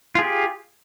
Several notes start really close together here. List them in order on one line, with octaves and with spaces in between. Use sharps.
F4 G#4 G4